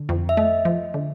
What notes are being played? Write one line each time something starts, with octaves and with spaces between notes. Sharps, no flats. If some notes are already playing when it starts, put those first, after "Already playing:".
Already playing: D3
F2
E5
A3 D#5
F3
D3